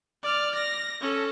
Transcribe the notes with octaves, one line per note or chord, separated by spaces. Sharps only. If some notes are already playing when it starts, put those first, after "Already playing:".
D5 F6
A#6
C#4 A4